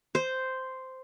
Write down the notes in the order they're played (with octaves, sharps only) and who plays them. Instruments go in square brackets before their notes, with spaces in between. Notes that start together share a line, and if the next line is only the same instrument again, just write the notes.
[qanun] C5